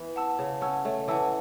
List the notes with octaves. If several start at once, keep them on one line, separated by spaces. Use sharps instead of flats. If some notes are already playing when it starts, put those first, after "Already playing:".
Already playing: E3 B3
F#5 A5 E6
C#3 C#5
C#4 F#5 A5 E6
A3 C#5
E3 F#5 A5 E6